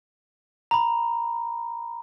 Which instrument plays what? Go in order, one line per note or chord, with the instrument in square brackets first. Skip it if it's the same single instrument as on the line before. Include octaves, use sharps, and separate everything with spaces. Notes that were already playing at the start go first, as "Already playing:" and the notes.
[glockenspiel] A#5 B5